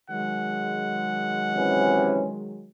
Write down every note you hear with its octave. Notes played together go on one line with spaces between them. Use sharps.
D#3 F#3 G#3 F#5
C3 E3 C#4